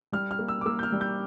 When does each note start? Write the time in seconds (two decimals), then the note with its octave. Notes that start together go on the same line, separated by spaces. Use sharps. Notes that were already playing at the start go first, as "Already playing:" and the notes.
0.12 G3 F6
0.31 F6
0.39 A#3
0.48 E6
0.61 D6
0.66 A#3 E6
0.79 G6
0.83 F6
0.92 G3
1.01 G6